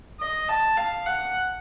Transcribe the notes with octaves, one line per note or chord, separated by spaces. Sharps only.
D#5
A5
F5
F#5